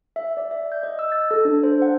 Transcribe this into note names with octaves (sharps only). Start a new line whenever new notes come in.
E5
D5
E5
G6
D#5
E6
A6
A4
D4
C5
F#5